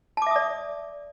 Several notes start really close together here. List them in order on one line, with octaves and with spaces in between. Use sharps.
A5 D6 E5 D#6 D5